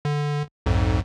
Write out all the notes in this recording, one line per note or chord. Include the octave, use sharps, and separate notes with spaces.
D3
B1 F2 G#2